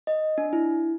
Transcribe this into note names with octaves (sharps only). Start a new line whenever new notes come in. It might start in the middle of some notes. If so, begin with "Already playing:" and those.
D#5
D4
E4